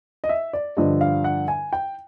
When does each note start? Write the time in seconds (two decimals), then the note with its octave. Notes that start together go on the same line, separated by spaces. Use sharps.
0.24 D#5
0.29 E5
0.53 D5
0.77 G2 D3 F3 D#5
1.01 F5
1.24 F#5
1.48 G#5
1.73 G5